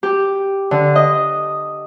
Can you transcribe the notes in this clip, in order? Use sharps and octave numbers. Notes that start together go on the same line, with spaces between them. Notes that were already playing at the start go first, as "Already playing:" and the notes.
G4
D3
D#5